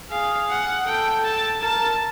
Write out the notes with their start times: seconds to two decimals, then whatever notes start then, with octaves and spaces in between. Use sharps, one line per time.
0.11 G#4 F5
0.50 F#5
0.87 A4 G5
1.24 A5
1.62 A#4 A5